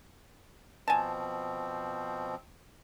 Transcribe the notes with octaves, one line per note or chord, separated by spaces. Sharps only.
B2 F3 C4 G#5 A5